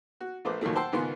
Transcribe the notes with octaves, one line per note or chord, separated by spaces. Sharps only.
F#4
A#1 A3 A#3 B4 C5 D6
D#2 A#2 D#3 F#3 A3
C5 F#5 G5 A5 C6 E6
C#2 G#2 D#3 B3 F4 C6